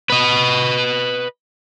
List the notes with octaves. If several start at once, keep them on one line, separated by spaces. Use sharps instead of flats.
B4 D#5